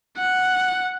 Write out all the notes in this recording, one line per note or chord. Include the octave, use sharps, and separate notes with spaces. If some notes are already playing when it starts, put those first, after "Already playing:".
F#5